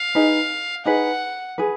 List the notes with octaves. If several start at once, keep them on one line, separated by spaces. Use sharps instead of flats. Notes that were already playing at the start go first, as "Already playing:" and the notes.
Already playing: F5
D#4 G#4 B4
D#4 G#4 B4 F#5
G#4 B4